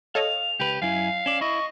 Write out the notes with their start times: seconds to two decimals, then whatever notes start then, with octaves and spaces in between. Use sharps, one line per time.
0.15 A4 C#5 D#5 F5 F7
0.60 C#2 G4 B4
0.82 F#2 E4 F5 G#5
1.26 C#4 D5 E7
1.41 E4 D#5 C#6